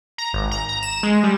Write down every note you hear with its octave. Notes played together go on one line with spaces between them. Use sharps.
A#5
G#1
A#5
A#5
E7
G#3
G3